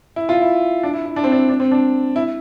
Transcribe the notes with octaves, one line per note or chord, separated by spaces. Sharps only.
E4
F4
E4
D4
E4
E4
D4
C4
D4
D4
C4
D4
E4